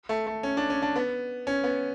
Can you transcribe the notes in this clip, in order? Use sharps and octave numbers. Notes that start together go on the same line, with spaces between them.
A3
A3
C#4
D4
C#4
D4
B3
C#4
B3